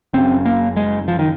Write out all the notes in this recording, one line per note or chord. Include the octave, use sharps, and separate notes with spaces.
F#1 F#2 C#3 C4
A#3
G#3
F3
D#3